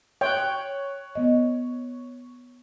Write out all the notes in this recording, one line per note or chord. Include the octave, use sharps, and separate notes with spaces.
C#5 G5 F#6
B3 D#5